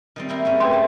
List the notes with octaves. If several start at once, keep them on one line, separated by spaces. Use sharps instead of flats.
D#3 G3 C4
A#3 E4 C5
G#2 G3 C#4
A3 B4 G5 C6
A5